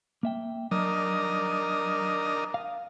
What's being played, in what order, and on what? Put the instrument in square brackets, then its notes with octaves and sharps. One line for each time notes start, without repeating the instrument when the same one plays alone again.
[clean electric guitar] A#3 E5 G5
[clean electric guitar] F#3 [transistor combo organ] D4 A#4 D#5
[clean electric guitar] F5